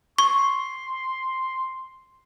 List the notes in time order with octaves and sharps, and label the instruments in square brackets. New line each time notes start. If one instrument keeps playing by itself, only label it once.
[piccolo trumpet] C6 [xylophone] C#6